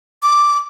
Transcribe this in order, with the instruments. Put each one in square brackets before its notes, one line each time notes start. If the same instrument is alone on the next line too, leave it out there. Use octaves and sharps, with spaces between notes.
[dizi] D6